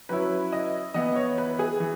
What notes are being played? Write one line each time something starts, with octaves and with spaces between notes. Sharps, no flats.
F#3 C#4 E4 B4
D#5
E3 B3 E4 D#5
C#5
B4
G#4
E3